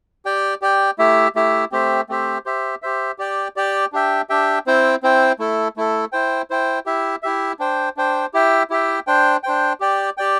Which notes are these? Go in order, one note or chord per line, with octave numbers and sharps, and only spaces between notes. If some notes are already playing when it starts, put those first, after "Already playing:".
G4 D5 G5
G4 D5 G5
A3 E4 G4 E5
A3 E4 G4 E5
A3 C4 G4 C5 E5
A3 C4 G4 C5 E5
G4 C5 E5
G4 C5 E5
G4 D5 G5
G4 D5 G5
D4 G4 E5 G5
D4 G4 E5 G5
C4 E4 C5 G5
C4 E4 C5 G5
A3 E4 A4
A3 E4 A4
E4 C5 G5
E4 C5 G5
E4 G4 E5
E4 G4 E5
D4 C5 G5
D4 C5 G5
E4 G4 E5 G5
E4 G4 E5 G5
D4 C5 G5
D4 C5 G5
G4 D5 G5
G4 D5 G5